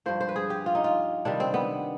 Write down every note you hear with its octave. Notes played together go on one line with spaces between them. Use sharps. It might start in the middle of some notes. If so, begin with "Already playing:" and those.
G2 F3 C5
C5
B4
G#4
G4
F4
D#4
F4
C3 D#3 G3 D4
C4
B3